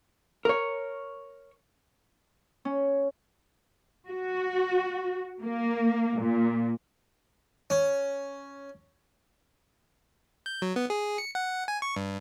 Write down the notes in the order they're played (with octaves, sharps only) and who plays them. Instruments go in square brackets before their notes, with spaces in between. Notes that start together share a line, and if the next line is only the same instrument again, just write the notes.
[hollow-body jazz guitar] A#4 C#5
[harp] C#4
[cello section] F#4
A#3
A#2
[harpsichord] C#4
[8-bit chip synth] G6
F#3
B3
G#4
C#7
F#5
G#5
C#6
G2